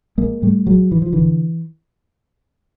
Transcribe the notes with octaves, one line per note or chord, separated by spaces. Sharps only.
A#1 G#3 A#3
G#2 G3 A3
A#1 F#3 G#3
G#2 E3
F3
A#1 D3 E3